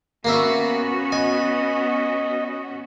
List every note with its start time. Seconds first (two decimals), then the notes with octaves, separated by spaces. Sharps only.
0.25 A#3 B3 C#4 F#4 A#4 E5
1.12 D#5 G#5